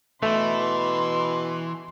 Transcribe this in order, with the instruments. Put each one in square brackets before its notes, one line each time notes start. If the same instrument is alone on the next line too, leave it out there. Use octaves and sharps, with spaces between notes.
[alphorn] B2 [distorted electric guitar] E3 [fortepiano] A3 [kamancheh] C6